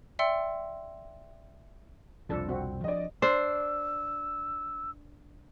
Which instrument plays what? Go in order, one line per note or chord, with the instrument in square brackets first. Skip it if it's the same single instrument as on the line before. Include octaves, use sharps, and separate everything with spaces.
[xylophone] D5 E5 G5 C6 E6 C#7
[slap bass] C2 F2 B2 [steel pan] F3 D4 A4
[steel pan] C4 F#4
[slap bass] F3 D4 [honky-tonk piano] D5 D#5
[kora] D4 [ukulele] C5 [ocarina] E6